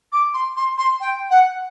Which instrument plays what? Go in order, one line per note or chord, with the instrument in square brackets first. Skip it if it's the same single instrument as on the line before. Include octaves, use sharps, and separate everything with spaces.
[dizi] D6
C6
C6
C6
G5
F#5